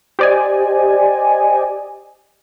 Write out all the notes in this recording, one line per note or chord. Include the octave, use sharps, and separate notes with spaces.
G4 C5 D5 D#5 G#5